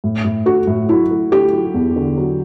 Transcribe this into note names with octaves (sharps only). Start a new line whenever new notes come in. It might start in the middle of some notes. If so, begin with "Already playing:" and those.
A2
A2
A3 F#4
A2
F#3 E4
A3
A3 G4
F#3
E2
D3
F#3